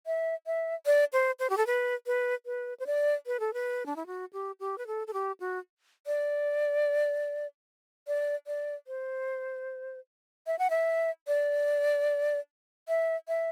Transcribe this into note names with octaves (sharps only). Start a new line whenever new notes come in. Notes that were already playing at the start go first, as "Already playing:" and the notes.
E5
E5
D5
C5
C5
G4
A4
B4
B4
B4
C5
D5
B4
A4
B4
D4
E4
F#4
G4
G4
B4
A4
A4
G4
F#4
D5
D5
D5
C5
E5
F#5
E5
D5
E5
E5